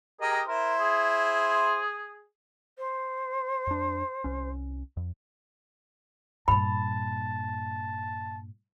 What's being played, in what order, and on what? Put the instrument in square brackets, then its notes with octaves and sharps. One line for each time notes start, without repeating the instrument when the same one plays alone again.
[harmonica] G4 A#4 D#5 [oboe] G#4
[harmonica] E4 C5 C6 [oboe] A#4
[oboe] G#4
[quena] C5
[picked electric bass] F2 D4
C2 C#4
F2
[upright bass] G2 A#2 [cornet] A5 [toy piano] B5